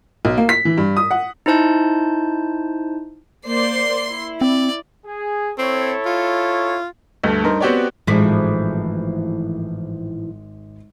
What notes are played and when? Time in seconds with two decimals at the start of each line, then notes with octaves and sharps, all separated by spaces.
0.25 B1
0.37 A#3
0.49 B6
0.65 E3
0.78 G2
0.97 D#6
1.11 F#5
1.46 D#4 E4 C5 A5 G6
3.46 A#3 C5 D5 C6 C7
4.08 E4
4.41 C4 D5
5.06 G#4
5.58 C4 E4 A4 C#5
6.06 F4
7.24 D2 G2 A3
7.44 G2 D#4 A#4 C5
7.60 B3 C4 F#4 G4 C#5 D5
8.07 G#1 A2 E3 F3 G#3 B6